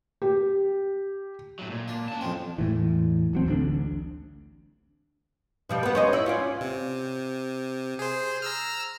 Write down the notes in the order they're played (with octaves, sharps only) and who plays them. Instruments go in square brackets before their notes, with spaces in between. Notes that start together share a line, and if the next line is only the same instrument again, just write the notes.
[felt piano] G4
[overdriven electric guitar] A2 F#3
A#2
[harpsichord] D4
[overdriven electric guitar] C#4 A5
[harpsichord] F2 C4
[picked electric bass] E2 A2 E3
D#1 F#3 C4
D1 A1 D2 D4
[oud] B2 F3 G3
B3 B4
C#4 C5 D#5
E4
C#4 F4 D5
[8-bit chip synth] C3
G#4 C5
A#5 E6 F6